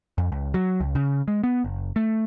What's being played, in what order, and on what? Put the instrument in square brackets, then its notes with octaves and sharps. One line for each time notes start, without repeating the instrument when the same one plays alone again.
[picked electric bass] F2
C#2
F#3
C#2
C#3
G#3
B3
F#1
A3